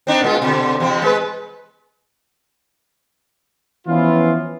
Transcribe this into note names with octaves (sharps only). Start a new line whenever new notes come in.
C4 D4 D#4
A#2 G#3 F4
B2 D3
E2 C3 C4
G#3 F#4 B4
E3 F3 B3 C#4 E4 F4